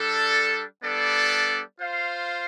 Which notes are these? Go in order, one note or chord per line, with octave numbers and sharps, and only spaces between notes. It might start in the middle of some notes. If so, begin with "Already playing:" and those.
Already playing: G3 D4 A4
G3 B3 D4 A4 D5
F4 C5 F5